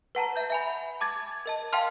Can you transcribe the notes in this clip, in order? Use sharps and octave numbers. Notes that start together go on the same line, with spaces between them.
B4 F#5 A5 A#5
E5 G6
E5 G#5 B5
A5 D6 G#6 A6
A#4 D#5 A5
F5 G5 A5 C6 F6